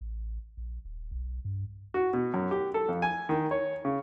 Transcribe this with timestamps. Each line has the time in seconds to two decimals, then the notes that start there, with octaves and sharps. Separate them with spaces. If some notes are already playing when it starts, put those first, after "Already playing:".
0.01 A1
0.57 A#1
0.85 D#1
1.11 B1
1.45 G2
1.94 F#4
2.13 B2
2.34 F#2
2.51 G4
2.74 A4
2.89 F2
3.02 G#5
3.29 D#3
3.51 C#5
3.85 C#3